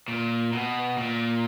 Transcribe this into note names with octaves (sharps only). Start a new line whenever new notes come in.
A#2
B2
A#2